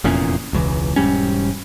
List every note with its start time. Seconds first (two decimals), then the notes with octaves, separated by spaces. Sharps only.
0.04 F1 E2 A#2 C#4
0.53 E1 C#2 E3
0.96 E1 G#2 G3 C#4